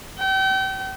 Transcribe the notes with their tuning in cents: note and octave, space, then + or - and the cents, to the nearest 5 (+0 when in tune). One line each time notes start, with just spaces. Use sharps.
G5 -35